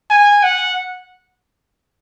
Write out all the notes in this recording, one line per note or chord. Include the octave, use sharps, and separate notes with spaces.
G#5
F#5